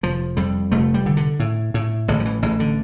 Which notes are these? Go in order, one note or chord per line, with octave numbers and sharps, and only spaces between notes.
F1 F3
F2 G3
F1 A3
G3
D3
D3
A2
A2
A1 D3
F3
E3
A1 E3
D3